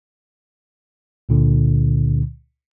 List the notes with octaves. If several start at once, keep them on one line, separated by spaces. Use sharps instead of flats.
C#2 A#2 D3